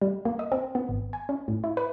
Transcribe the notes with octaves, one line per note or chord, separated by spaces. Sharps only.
G3
A#3
D#5
C4
B3
G#1
G#5
C#4
A2
E4
B4